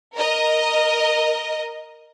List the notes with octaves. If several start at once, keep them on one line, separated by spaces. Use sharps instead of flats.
A#4 D#5